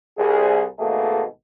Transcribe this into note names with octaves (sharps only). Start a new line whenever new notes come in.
C2 G#4
G#1 B2 A3 A#3 G#4 A4